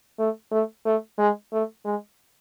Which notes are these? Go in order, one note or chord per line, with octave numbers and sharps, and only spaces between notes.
A3
A3
A3
G#3
A3
G#3